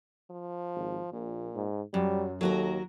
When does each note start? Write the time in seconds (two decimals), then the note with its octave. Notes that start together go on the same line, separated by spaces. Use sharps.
0.30 F3
0.76 G#1
1.13 A#1 A#2
1.55 G#2
1.94 F#2 F#3 G3
2.41 D#2 F#3 F#4 A4 A#4